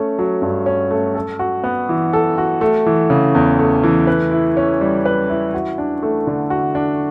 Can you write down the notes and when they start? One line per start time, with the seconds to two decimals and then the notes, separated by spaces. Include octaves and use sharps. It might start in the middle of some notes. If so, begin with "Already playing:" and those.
Already playing: A3 C#4
0.19 F#3
0.42 G2
0.66 C#4
0.91 A3
1.15 A4
1.39 F#4
1.64 B3
1.89 E3
2.13 A4
2.38 F#4
2.61 A3
2.86 E3
3.10 C#3
3.35 E2
3.59 A3
3.83 E3
4.07 B4
4.31 E4
4.57 C#4
4.81 G3
5.05 B4
5.29 E4
5.54 F#4
5.78 D4
6.03 A3
6.27 D3
6.50 F#4
6.75 D4